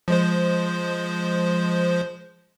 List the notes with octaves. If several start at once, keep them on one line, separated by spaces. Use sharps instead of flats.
F3 G#3 C5